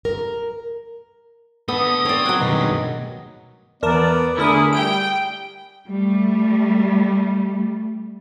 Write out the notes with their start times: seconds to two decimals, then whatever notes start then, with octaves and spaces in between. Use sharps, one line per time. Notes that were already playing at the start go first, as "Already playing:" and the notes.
0.05 A#4
1.68 B3 A4 D5 D#6
2.05 C4 C#5 D5
2.25 F#3 F#5
2.41 G2 B2 D#3 G#3
3.83 E2 B3 A#4 D5 A5
4.38 D3 A3 E4 G#4 A#4 D#6
4.73 G3 G5 D7
5.89 G3 A3